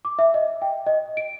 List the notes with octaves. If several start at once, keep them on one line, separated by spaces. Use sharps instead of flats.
D6
E5
D#5
G5
D#5
D7